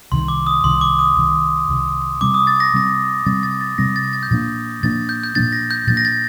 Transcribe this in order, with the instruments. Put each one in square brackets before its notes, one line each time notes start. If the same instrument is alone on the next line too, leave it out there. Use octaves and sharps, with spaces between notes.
[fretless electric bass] C2 C3 D#3 [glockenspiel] C6
[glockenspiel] D6
D#6
[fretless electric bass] C2 C3 D#3 [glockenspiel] C6
[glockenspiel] D6
D#6
[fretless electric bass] C2 C3 D#3
C2 C3 D#3
[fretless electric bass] C3 G3 C4 [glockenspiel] D6
[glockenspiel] D#6
A6
A#6
[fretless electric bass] C3 G3 C4 [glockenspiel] A#6
[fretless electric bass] C3 G3 C4 [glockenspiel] A6
[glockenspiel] A6
A6
[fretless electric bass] C3 G3 C4 [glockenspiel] A#6
[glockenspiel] A6
A6
G6
[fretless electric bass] A#2 F3 A#3 D4 [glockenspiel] A6
[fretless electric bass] A#2 F3 A#3 D4 [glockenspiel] A6
[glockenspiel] G6
G6
[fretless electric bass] A#2 F3 A#3 D4 [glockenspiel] A6
[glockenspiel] A#6
G6
[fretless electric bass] A#2 F3 A#3 D4 [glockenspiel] A6
[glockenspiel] A#6
A6